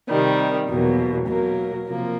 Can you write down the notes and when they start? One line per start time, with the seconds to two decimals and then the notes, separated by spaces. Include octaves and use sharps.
0.09 C3 D#3 G3
0.69 E2 B2 F#3 A#3
1.27 B2 F#3 A#3 A#4
1.87 C3 F3 A#3